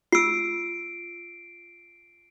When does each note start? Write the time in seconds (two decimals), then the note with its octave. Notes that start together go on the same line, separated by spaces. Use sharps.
0.12 F4 E6 C7 D7